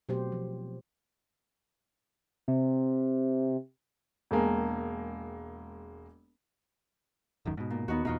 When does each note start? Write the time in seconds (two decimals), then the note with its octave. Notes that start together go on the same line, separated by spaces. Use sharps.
0.09 B2 F#3 A3 C4 G4 C5
0.32 F3
2.48 C3
4.31 E1 G#3 A#3
7.45 D1 F#2 D#3
7.57 G#2 B2
7.70 A#2
7.88 D#2 B3 D#4 F#4
8.05 E2 B2 D#4 F4 F#4